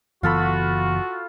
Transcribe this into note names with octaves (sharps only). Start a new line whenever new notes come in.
F#1 E3 B3 F4 F#4 A4 B5